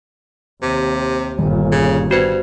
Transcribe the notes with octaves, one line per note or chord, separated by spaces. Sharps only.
D#2 C3
G1 A#2 D#3 G3
C#3
G2 B3 F#4 C5